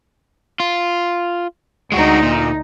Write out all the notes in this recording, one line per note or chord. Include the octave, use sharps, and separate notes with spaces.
F4
D2 G#3 D#4 F#4
A#2